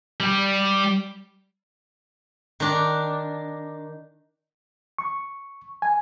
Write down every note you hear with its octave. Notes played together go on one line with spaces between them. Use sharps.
G3 G4
D#3 D4
C#6
G#5